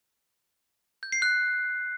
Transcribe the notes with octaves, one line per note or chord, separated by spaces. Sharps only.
G6
C7
F#6